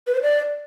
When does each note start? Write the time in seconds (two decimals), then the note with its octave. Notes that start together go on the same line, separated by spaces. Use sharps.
0.07 B4
0.15 C5
0.22 D5